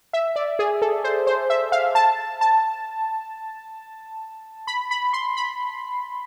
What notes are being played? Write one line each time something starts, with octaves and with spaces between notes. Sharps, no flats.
E5
D5
G#4
A4
C5
C5
E5
F5
A5
A5
B5
B5
C6
B5